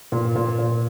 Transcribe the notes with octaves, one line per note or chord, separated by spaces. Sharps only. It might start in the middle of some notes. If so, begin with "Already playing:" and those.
A#2
A#2
A#2